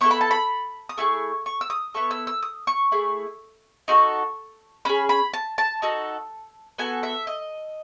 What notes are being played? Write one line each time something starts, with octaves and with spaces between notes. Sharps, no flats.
B3 E4 A4 C#6
B5
A5
B5
D#6
A3 E4 G#4 C#6
C#6
E6
D#6
B3 E4 A4 C#6
E6
E6
D#6
C#6
A3 E4 G#4
D#4 F#4 A4 C#6
C#4 G#4 B5
B5
A5
A5
D#4 F#4 A4
B3 F#4 A4 G#5
E5
D#5